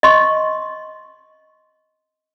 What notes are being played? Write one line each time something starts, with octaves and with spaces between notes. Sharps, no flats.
D#5 C6 C#6